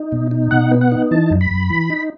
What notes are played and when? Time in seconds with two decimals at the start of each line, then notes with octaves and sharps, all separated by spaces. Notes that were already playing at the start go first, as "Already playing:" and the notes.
Already playing: D#4
0.12 B2
0.31 D#4
0.51 B2 F#5
0.71 B3
0.81 F#5
0.92 D#4
1.11 E3 A5
1.31 F#2
1.41 B5
1.51 F#2
1.70 E3
1.90 D#4